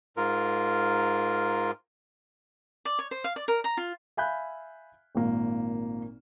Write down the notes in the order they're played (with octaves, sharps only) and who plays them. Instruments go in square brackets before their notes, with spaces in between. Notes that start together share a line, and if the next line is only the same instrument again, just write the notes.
[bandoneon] G#2 F4 A#4
[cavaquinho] D5
C#5
C5
F5
D5
A#4
A#5
F4
[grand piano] E5 F5 G#5 B5 F#6 G6
G#1 A#2 A#3